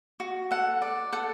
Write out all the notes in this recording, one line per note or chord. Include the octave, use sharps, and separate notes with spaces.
F#4
A4 F#5
D5
A4 F#5